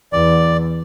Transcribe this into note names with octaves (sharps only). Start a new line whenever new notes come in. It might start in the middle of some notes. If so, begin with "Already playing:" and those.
E2 D5